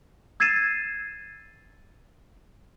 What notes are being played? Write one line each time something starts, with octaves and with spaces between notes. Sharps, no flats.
E6 G#6 A6 C7 D#7 E7